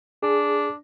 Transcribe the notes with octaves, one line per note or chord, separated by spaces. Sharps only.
D4 G#4